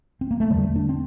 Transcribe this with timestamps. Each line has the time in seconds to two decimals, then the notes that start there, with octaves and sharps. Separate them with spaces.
0.21 C4
0.31 A#3
0.40 A3
0.50 E2 D3 G3
0.63 A3
0.76 D4
0.89 C4